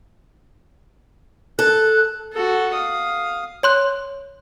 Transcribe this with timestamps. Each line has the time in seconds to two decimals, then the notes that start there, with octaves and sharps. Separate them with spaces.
1.59 A4 F#6
2.33 F#4 A4
2.74 F5 D#6
3.63 C#5 C6 F#6